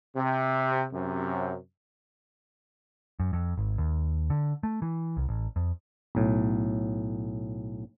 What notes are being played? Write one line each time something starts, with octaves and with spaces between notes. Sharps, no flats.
C3
F#2 C3
F#2
F2
G#1
D#2
D3
A3
E3
C2
A1
F2
B1 A2